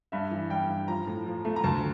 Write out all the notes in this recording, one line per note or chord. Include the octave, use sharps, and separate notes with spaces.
G2 E5
E3
G3 G5
G2
F3 A#5
A2
F3
A3
A#5
D2 A5